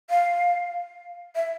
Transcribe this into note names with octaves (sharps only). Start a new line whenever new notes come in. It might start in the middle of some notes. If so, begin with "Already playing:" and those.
F5
E5